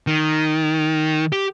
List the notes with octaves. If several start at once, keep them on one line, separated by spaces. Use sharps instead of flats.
D#3
G4